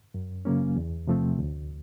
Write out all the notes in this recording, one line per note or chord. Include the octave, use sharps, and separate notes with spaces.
F#2
C#3 F#3 A#3 C#4
E2
C3 F3 A3 C4
D2